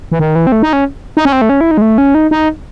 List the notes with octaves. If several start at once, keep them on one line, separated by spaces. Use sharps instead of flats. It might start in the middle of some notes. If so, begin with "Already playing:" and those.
E3
D#3
E3
C4
A3
D#4
C#4
D#4
C#4
C4
A3
C#4
E4
D#4
G#3
A3
C#4
D#4
D#4